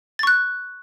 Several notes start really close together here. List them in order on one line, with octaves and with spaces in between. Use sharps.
A6 C#6 F#6